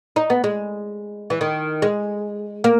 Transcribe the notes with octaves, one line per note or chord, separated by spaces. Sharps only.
D#4
B3
G#3
E3
D#3
G#3
A#3